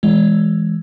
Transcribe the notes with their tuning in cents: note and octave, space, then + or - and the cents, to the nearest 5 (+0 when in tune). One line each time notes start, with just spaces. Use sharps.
E3 +0 G#3 +0